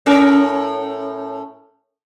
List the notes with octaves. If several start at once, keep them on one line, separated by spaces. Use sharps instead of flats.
A2 C#4 A#4